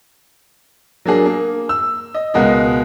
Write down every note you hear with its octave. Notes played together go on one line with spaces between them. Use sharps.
F#3 A#3 D4 G#4
A#3
E6
D#5
C#2 B2 G#3 F#4 A#4 D#5